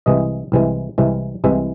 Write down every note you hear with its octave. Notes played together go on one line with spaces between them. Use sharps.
C2 C3 E3 G#3 D#5
C2 C3 E3 G#3
C2 C3 E3 G#3
C2 C3 E3 G#3 E5